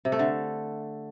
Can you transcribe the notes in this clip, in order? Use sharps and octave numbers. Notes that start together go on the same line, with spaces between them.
C3
A3
D3